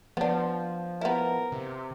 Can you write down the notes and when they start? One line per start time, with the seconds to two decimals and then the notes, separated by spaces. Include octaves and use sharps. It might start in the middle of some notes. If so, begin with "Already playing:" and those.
0.17 F3 B3 D4
1.01 B3 E4 A#4
1.52 C3